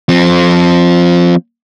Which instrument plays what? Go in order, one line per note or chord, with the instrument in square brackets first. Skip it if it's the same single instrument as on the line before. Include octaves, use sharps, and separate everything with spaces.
[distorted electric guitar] F3 C4